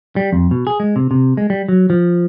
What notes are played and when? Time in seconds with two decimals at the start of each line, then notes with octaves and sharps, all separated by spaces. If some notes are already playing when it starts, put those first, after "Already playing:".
0.16 G3
0.33 F2
0.51 B2
0.67 G#4
0.80 G#3
0.96 C3
1.11 C3
1.37 G#3
1.50 G3
1.68 F#3
1.90 F3